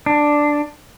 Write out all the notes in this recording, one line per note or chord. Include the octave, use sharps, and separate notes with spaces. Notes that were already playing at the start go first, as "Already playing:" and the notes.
D4